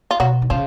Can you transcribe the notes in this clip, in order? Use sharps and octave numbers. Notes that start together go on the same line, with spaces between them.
F4
B2 F#3 F#4
D#3
C#3 F3 F4